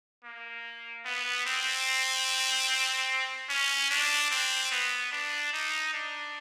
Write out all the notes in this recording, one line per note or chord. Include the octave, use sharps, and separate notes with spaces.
A#3
B3
C4
C#4
D4
C4
B3
D4
D#4
D4